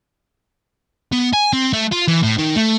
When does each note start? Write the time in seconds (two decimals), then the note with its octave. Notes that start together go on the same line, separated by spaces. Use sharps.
1.13 B3
1.34 G#5
1.53 C4
1.73 A3
1.92 F4
2.08 E3
2.23 A2
2.38 D#3
2.56 A3